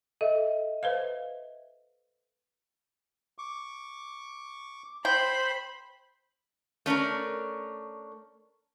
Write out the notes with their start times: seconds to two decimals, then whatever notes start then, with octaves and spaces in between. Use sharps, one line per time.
0.21 A4 D#5 E5
0.83 B4 C5 F5
3.38 C#6 D6
5.05 C5 G5 B5
6.86 A3 C#4 D4 A#4